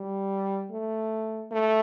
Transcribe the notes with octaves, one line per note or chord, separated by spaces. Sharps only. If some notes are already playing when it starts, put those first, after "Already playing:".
Already playing: G3
A3
A3